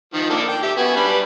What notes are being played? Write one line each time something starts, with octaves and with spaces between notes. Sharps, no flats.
D#3 F3
A#3 D4 A4
G5
G4 E5
B3 F#4 G#5
G3 D4 B4